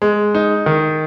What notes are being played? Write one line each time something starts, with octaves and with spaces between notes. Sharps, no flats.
G#3
D#4
D#3